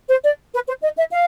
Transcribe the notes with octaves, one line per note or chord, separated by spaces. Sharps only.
C5
D5
B4
C5
D#5
E5
F5